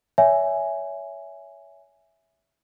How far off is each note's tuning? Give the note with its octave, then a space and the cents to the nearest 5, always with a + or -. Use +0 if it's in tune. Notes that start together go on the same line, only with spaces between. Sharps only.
C#5 +25 E5 +0 G#5 +0